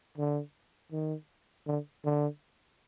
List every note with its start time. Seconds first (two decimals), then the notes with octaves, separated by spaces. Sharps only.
0.18 D3
0.92 D#3
1.67 D3
2.05 D3